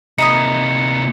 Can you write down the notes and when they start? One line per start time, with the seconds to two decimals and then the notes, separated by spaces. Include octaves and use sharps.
0.18 C3 A#3 D#4 B5 D#6 C#7